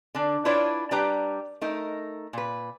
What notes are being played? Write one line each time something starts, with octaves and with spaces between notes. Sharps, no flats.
D3 D4
D4 E4 F4 B4 C#5 D5
G3 D4 G4 B4 G5 A#5
A3 D#4 A#4
A#2 B4